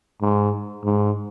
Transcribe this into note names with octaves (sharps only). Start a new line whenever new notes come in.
G#2
G#2